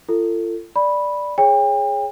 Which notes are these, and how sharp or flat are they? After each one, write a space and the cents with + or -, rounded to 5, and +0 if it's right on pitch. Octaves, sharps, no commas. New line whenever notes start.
F4 -35 A4 +25
D5 +0 B5 -10
G#4 +0 C#5 +0 G5 +35